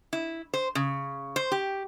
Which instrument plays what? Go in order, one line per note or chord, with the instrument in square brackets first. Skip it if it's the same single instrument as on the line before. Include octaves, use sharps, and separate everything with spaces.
[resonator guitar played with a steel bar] E4
C5
C#3
C5
G4